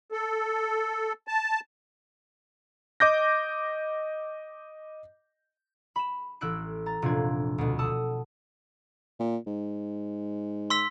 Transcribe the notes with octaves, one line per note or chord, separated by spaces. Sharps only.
A4
A5
D#5 D6 G6 A#6
B5 E7
A1 E4 E6 F#6 D7
A#5 A6
F1 A#2 D4 F4 G#6
D2 B2
F#5 A5 D#6 E6
A#2
G#2
C6 E6 B6